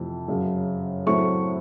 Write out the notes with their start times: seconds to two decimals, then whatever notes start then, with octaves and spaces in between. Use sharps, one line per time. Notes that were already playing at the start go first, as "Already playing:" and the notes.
Already playing: F2 C3 E3 A3
0.28 F#2 C#3 F#3
1.06 A2 F#3 A3 C4 C#6